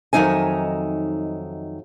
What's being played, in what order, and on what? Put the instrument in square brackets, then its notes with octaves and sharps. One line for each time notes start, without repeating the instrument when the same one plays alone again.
[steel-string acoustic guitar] F2 D#3 F#3 D#4 E5 G#5